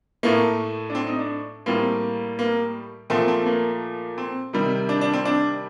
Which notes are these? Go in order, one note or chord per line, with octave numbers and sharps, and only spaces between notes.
A2 A3 A#3
D4
C4
D#4
D4
A2 G3 A#3 C4
A#3
A#2 F3 A3 C4
C4
A#3
C4
C3 D#3 G3
D4
D4
C4
D4